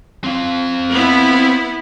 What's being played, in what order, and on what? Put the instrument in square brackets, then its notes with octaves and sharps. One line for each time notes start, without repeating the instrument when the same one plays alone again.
[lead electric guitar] C4 F5
[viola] B3 E4